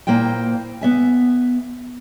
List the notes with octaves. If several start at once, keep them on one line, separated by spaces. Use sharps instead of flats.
A#2 A#3 E4 C5 G5
B3 E5 G#5